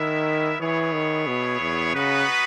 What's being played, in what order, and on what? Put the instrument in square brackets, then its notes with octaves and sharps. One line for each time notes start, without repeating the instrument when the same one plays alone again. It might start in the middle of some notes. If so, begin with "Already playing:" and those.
Already playing: [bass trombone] D#3 [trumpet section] G#3 B3 E4 A#4 E5
[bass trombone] E3 [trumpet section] B3 E4 G#4 C#5
[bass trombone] D#3
B2
E2
[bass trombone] C#3 [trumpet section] B3 D#4 F#4 B4